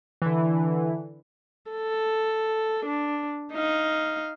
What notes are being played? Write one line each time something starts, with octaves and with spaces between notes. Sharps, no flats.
D3 E3
A4
D4
D#4 F5